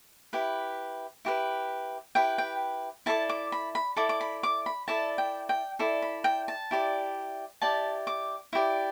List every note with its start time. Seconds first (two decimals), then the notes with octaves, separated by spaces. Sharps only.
0.33 E4 G4 B4
1.25 E4 G4 B4
2.15 E4 G4 B4 G5
2.38 G5
3.06 E4 A4 D5 A5
3.29 D6
3.52 B5
3.75 B5
3.97 E4 A4 D5 D6
4.09 D6
4.21 B5
4.43 D6
4.66 B5
4.88 E4 A4 D5 A5
5.18 G5
5.49 G5
5.79 E4 A4 D5
6.02 B5
6.24 G5
6.48 A5
6.71 E4 G4 D5
7.62 E4 G4 D5 A5
8.07 D6
8.53 E4 G4 D5